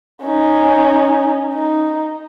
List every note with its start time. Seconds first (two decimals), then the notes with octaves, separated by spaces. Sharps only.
0.22 C#4 D#4
1.54 D#4